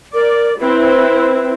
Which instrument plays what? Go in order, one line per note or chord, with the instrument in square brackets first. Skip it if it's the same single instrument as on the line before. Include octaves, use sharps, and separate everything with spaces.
[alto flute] A#4 [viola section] D5
[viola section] C4 E4 [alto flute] B4